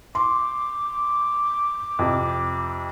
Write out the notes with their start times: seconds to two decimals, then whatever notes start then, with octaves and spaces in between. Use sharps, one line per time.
0.15 C6 D6
1.99 F2 C3